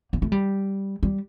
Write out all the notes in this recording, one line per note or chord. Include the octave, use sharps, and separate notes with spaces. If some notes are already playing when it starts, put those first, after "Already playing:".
A#3
A3
G3
G3